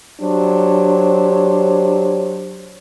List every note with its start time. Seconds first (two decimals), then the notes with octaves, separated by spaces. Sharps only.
0.22 F#3 D4 G4 C5 C#5